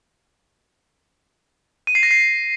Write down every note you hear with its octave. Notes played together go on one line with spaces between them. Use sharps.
D#7
C7
A#6
C7